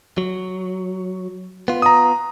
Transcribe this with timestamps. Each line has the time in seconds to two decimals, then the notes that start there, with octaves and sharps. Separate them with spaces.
0.18 F#3
1.68 B3 F4
1.82 A#5 D#6